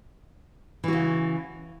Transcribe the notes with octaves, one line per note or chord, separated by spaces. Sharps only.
C#3 E3 F#4